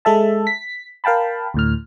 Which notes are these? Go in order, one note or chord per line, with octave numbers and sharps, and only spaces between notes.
G#3 A4 E5 A5
B6
A#4 F5 G5 A5 B5
D2 A2 F6